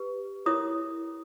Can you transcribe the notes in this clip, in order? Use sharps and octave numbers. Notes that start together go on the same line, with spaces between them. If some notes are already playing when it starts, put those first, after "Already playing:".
Already playing: G4 B4
E4 A#4 C#5 D#6